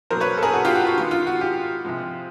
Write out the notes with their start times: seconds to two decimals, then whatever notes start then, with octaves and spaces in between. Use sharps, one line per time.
0.10 B2 F#3 A#3 A#4 C5
0.20 B4 C#5
0.37 A4
0.43 G#4 A#4
0.53 F#4 G#4
0.65 F4 G4
0.75 F#4
0.87 F#4
0.97 D#3 G#3 B3 F4
1.11 F4
1.27 F#4
1.41 F4 G4
1.85 C3 F3 G#3